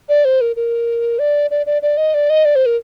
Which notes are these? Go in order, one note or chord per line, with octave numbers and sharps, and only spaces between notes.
D5
C5
A#4
A#4
D5
D5
D5
D5
D#5
D5
D#5
D5
C5
A#4